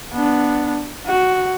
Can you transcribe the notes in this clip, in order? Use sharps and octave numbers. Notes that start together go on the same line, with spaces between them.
B3 D4
F#4